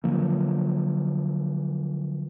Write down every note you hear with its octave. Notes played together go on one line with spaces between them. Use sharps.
D3 F3 F#3 A#3